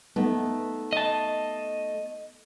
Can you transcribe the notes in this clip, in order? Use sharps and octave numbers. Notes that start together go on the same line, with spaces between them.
A3 B3 D#4
D#5 A5